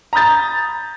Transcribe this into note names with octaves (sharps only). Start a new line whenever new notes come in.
A#5 B5 D#6 G6 A6